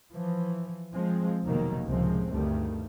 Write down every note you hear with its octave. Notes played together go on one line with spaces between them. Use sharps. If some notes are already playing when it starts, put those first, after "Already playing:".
E3 F3
F3 G#3 C4
F1 B2 D#3 F#3 A#3
C#2 A2 C3 F3 G#3 C4
D2 G2 D#3 G3 A3